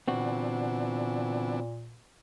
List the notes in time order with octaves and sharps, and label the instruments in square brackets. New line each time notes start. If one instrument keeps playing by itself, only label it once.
[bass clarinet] A#2 [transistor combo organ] D3 E3 D4 [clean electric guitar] B3 C4 F#4